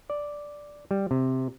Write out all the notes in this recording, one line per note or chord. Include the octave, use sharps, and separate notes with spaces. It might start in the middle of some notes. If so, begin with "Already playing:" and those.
D5
G3
C3